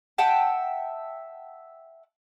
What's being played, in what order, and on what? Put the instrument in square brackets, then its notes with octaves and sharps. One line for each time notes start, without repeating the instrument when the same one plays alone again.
[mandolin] E5 F#5 G5 A5